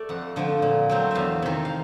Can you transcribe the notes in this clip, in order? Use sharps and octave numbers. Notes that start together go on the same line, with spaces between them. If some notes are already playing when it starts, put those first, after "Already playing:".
Already playing: A3 D5
F2 F#5
D3 F3 A3
A#2
F#3 A3 C4
E2 E5 F5
C3 D#3
F5